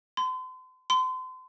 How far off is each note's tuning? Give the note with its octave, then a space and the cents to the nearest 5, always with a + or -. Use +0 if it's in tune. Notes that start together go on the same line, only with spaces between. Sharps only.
C6 -40
C6 -35